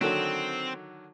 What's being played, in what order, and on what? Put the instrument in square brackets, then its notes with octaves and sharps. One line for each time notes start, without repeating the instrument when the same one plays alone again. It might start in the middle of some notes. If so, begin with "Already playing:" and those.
[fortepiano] D3 D#3 F#3 [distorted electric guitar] C4